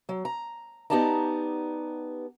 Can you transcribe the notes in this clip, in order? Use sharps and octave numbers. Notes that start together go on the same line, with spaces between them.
F#3
A#5
B3 D#4 G4 D5 A5 A#5